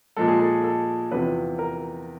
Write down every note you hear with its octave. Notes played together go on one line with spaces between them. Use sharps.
A#2 F3 G#3 A4
G#4
A4
A4
E2 C3 F3 B4
A#4